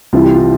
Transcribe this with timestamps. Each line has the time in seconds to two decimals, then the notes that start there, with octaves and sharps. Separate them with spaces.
0.13 C2 C3 E3 F4
0.24 G4
0.34 F4